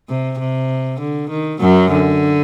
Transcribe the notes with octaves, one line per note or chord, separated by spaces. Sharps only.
C3
C3
D3
D#3
F#2 F#3
D3